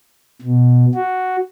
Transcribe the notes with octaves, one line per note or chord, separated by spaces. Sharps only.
B2
F#4